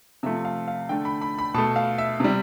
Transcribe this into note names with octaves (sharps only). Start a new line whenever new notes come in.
C3 F3 A3 E5
F5
F5
D3 A3 G5
B5
B5
B5
B2 A3 A5
F5
E5
C3 G3